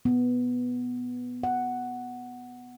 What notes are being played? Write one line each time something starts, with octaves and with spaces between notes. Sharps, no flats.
B3
F#5